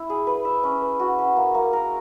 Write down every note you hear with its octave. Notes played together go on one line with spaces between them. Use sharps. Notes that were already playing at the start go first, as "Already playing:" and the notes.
Already playing: E4
G#4
B4
E5
C#4
B4
F#4
C#4
A#3
A#3
A#4